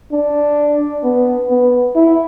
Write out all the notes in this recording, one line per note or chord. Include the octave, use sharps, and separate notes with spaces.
D4
B3
B3
E4